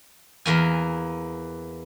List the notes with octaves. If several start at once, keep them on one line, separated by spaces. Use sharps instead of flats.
E2 A#3 G#5